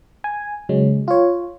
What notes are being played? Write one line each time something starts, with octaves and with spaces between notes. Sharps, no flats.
G#5
C#3 F#3 G#3 C#4
F4 C#5